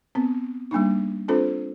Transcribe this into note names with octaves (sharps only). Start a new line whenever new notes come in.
B3 C4
G3 A#3 D4 D#4
C4 D4 F4 A4 C5